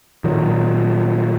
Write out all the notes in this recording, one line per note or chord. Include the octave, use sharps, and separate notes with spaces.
A#2 D#3 F#3